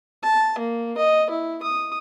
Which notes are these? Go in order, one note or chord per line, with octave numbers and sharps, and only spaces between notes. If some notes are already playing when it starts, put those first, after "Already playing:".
A5
A#3
D#5
E4
D#6